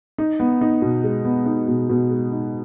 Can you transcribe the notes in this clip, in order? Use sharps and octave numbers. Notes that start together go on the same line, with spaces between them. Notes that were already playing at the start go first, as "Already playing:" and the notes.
D#4
B3
D#4
B2
G#3
B3
D#4
B2
B2
G#3
D#4